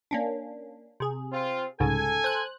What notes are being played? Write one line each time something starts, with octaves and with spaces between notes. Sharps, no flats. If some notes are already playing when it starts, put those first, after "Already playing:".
A#3 C#4 D4
C3 G#4
C4 F4
C2 G#2 C#3 A4 G#5
C5 F#6